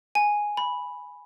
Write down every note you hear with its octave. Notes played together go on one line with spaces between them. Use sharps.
G#5
B5